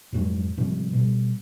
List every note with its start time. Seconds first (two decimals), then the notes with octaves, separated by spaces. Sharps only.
0.12 F2 G#2 F#3 G#3
0.57 G#2 C3 F3 G3
0.93 B2 G3